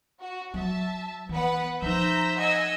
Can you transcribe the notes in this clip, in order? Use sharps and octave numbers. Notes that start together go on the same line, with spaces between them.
F#4
F#3 E5 A5
E3 B3 B4 F#5
F3 D#4 C5 E5 A#5 G6 A#6
D#5 F#5 G#5 E6 G#6